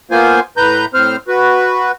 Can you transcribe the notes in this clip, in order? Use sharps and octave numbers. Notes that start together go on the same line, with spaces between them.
A#3 B3 F4 C5 G#5
A2 B4 A#5 G6
A2 C4 C5 F6
F#4 B4